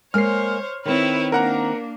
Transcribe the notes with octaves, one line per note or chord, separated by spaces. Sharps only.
G#3 A#3 C5 C#5 F6 C7
D#3 C4 E4 B4 C#5
A#3 D4 A#4 F#5 A#5